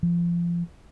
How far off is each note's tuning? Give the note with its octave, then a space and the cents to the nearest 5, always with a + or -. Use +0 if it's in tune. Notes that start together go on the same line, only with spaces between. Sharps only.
F3 -25